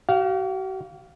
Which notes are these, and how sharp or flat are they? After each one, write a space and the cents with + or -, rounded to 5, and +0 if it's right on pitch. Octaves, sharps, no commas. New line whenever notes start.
F#4 +45 F5 +0